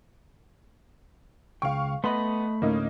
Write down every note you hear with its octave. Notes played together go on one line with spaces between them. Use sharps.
C#2 F5 G5 C#6
A3 B3 D#5 B5 C6
D2 A2 A#3 C#4 D#4